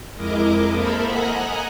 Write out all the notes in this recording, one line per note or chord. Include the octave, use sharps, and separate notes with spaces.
F2 G#3 E4 A#4 D#5 D6
A#3 A4 A#4 C5 E5 B5
D#5 F#5 G#5 A#5 F#6